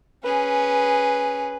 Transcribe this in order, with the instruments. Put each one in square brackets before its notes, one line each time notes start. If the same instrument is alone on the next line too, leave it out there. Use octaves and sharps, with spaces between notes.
[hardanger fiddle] C#4 G#4 [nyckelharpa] B4